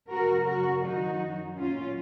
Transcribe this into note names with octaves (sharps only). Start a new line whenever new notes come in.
F#2 C#3 F#3 F#4 A#4
F#4 A#4
F#2 D#3 F#3 D#4 F#4
A#2 F#3 C#4 F4